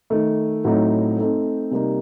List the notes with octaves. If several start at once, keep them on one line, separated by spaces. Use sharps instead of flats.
D#3 A3 D#4
A2 F#3 A3 C4 D#4
A3 C4 D#4 A4
C3 G3 A#3 D#4